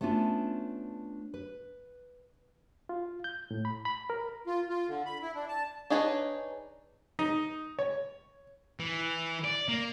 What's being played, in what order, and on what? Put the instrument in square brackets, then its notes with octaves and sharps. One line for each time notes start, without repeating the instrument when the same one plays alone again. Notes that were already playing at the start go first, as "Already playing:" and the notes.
[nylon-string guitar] A3 B3 C#4 D4 F4
B4
[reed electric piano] F4
G6
A2
B5
B5
A#4
[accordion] F4
F4
D3
B5
E4
D4
A5
[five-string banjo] D4 D#4 G#4 B4 C#5
[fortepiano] D#4
C#5
[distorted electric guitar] E3
D5
A#3